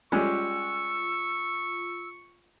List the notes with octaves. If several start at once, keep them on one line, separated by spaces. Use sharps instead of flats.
G3 G#3 C#4 F4 C#6 E6